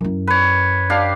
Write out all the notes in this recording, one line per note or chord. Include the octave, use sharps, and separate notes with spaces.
F#2 E4
B4 C#5
D4 G4 F5